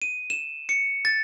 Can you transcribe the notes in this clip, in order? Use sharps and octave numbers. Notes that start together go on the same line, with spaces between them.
D#7
E7
C#7
A6